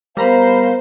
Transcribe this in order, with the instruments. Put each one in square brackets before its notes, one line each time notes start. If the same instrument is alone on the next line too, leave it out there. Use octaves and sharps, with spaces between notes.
[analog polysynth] G3 A#5 B5 [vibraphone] B3 A#4 [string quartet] C5 [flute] F5